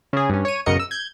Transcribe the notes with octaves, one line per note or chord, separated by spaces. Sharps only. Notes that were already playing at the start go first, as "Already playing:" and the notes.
C#3 G#4
G2 C#4
C#5 D#7
B1 F#2 C#3 A#4 D#5 C#7
E6
G6 G#6